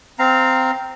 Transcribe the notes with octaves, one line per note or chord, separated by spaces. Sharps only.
C4 F5 A#5